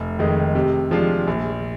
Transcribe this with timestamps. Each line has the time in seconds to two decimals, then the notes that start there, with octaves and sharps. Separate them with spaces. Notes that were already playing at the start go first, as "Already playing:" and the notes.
Already playing: F1
0.19 F2 D#3 G#3 D#4
0.55 C3
0.91 F3 G#3 D4 F4
1.27 A#1